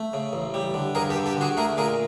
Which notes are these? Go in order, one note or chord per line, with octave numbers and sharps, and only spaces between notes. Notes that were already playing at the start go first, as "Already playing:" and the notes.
Already playing: A3
C#3
A1
G3
D3
G2 G#4 A#4
G4 A4
D3
G4 A4
D3 F#4 G#4
A3 G#4 A#4
A#2 G#4 A#4